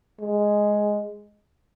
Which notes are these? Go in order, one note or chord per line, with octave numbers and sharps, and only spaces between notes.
G#3